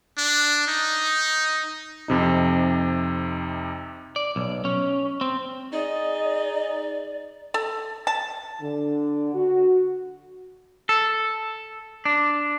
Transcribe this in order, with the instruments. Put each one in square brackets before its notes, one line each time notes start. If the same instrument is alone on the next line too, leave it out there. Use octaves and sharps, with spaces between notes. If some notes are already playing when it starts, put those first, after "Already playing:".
[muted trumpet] D4
D#4
[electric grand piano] F2 C3 D#4
[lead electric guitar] D5
B1
C#4
C4
[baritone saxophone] D#4 [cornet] G#4 [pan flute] D5 [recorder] D#5
[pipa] A4
A5
[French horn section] D3
F#4
[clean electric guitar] A4
D4